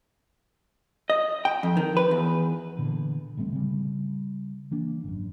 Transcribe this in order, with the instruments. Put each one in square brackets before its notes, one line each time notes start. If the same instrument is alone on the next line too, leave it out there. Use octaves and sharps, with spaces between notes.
[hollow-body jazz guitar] D#5
G5
F2
D#3
B4
E2
[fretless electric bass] A#2 D3 E3
A1 G3 A3 C4
C#3 G3
E3 A#3 D4
G#1 F#2